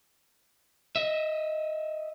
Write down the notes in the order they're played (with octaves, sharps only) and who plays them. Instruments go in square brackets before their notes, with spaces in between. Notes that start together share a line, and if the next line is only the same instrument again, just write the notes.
[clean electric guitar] D#5 E5